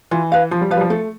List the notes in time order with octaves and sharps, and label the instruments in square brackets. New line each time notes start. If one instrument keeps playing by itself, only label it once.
[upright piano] E3 [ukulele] F4
[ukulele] B4 F5
[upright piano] F3 [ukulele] F4
[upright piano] G3
[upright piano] F3 [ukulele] B4 F5
[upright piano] G3
F3
[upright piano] A3 [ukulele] A4